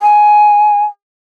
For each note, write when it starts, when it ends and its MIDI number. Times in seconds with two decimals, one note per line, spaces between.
0.02 0.84 80